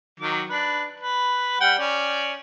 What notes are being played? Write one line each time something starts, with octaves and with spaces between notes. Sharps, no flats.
D#3 F#3 D6
D4 B4
B4
G3 F#5 G5
C#4 D5